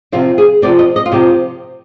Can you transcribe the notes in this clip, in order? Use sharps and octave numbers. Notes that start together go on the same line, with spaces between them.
C3 F3 C4 F4
G#4
C3 F3 C4 D5
D#5
D#5
F4
C3 F3 C4 G4